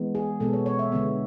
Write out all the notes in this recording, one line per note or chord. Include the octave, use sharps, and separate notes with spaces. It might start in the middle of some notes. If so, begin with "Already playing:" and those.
Already playing: E3 G#3 B3
G#4
B2 G#3 B3 A4
C#5
C#5
E5
D3 G#3 B3